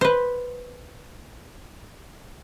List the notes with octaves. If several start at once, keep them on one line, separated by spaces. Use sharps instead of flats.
B4 C5